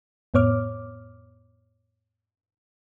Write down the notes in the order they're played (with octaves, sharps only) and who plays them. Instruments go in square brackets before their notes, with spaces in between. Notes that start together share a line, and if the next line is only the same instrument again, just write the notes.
[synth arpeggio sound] F2 A2 B3 C#5 D6 F6